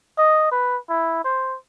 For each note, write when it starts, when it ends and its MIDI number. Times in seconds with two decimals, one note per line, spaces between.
0.18 0.47 75
0.51 0.77 71
0.89 1.22 64
1.24 1.56 72